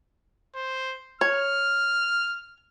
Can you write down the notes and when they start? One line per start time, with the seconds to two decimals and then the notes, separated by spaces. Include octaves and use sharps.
0.55 C5
1.21 C#5 F6